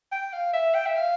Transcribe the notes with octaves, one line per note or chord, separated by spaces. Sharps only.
G5
F5
E5
G5
E5
F5